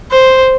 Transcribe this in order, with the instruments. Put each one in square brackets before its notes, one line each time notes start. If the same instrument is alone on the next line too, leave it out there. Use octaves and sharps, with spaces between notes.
[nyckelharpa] C5